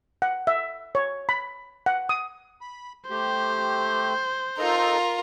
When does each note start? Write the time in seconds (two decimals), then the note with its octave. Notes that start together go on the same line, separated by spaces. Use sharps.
0.22 F#5
0.47 E5
0.95 C#5
1.29 B5
1.86 F#5
2.09 D#6
2.61 B5
3.10 A3 G4 C5
4.58 D#4 F4 A4 A#4 D#5